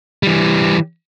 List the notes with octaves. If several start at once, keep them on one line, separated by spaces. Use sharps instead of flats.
E3 G3